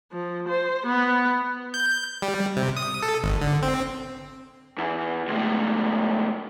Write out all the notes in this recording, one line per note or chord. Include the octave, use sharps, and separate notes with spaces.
F3
C5
B3
G6
G3
C3
D#6
A4
G#1
D3
C4
E2
C#2 A2